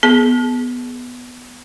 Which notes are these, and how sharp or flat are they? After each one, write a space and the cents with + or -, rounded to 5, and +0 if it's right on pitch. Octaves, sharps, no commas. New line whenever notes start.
B3 +0 G#4 +20